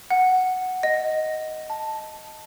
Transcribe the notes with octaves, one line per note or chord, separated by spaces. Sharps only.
F#5
D#5
A5